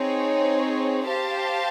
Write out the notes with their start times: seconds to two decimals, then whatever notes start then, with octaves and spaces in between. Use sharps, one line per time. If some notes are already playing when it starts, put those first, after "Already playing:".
Already playing: C4 D#4 G#4 C#5
1.07 G4 C5 F5 A5